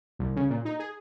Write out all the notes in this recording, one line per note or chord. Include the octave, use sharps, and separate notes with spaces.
C2
C#3
A#2
D#4
G#4